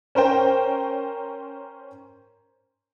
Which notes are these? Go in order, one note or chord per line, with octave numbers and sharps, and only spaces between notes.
C#4 A#4 C5 G5